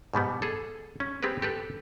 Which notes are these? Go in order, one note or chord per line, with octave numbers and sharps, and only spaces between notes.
G#2 B2 G3 B3
G#4 A4
C#4
B3 C4 G4 G#4 B4
G4 A4 B4